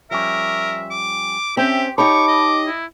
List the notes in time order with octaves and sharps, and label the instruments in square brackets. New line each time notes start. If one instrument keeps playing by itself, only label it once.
[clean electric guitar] F3 G3 C#4 [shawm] A#4 [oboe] E5
[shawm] D6
[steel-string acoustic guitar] C4 C#4 [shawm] G4 [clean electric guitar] C5 G5 [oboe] E5
[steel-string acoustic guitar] D#4 G4 C#5 [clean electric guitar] A5 B5 [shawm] C#6 [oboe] D6
[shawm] D#5
[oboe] E4